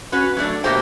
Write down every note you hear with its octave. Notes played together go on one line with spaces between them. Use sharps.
C#4 F#4 B4
F#3 A3 D4
B2 A3 A#3 G4 C5 G5